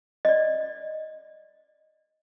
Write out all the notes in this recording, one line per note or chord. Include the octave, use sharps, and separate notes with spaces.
D5 D#5